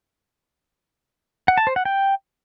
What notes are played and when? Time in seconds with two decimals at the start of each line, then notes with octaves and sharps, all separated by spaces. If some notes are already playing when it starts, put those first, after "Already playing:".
1.48 F#5
1.57 A5
1.67 C5
1.76 F#5
1.85 G5